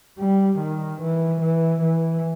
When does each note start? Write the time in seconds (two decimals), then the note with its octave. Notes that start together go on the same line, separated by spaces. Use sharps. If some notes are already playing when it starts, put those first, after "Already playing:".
0.19 G3
0.59 D#3
1.01 E3
1.41 E3
1.81 E3